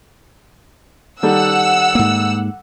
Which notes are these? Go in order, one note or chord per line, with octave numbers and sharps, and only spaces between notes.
D#3 G3 A4 F#5 E6
G#2 A#3